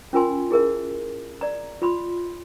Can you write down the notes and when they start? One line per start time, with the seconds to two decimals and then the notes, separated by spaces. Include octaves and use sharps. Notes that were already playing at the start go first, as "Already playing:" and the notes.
0.13 C#4 F4 A#4 G#5 C6
0.50 E4 G#4 A#4 E5
1.41 D5 A#5
1.82 F4 B5 C6